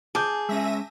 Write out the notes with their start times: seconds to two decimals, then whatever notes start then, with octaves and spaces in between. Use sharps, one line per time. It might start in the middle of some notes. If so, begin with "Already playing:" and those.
0.15 G#4 A5 D6 G6
0.49 G#3 C#4 E5 A#6 D#7